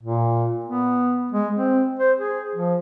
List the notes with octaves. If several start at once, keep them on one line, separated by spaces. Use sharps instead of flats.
A#2
B3
G#3
C4
C5
G#4
F3